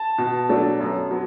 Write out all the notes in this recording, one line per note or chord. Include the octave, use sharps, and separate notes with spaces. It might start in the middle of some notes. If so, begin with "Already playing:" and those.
Already playing: A5
B2
F#3 A3 D4
F#2
F#3 B3